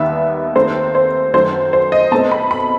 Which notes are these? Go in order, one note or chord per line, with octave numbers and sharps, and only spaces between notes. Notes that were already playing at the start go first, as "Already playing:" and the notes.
Already playing: D#2 D#3 G3 B3 E5
D#2 D#3 A3 C4 C5
C5
F#2 D#3 F#3 A3 C5
C5
D#5
B2 A3 C4 A5
B5
B5